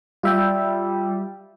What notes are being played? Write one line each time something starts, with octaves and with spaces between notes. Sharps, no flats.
G3 F4 E5 G5